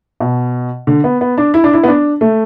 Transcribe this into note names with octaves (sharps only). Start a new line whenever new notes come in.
B2
D3
B3
B3
D4
E4
D4
E4
B3
D4
A3